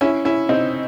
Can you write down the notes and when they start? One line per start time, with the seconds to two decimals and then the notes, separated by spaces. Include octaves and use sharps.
0.01 C#4 E4
0.25 C#4 E4
0.49 C4 D#4